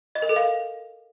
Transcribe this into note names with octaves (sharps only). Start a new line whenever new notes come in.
D#5
A#4
A4
F5